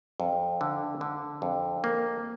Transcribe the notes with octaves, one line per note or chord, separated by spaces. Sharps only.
F2
D3
D3
F2
A#3